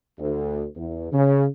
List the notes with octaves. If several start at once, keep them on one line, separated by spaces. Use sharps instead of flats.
D2
E2
C#3